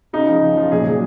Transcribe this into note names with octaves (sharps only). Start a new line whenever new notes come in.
C#3 D#4
F3
C#3
F3
A#2 G#4
F#3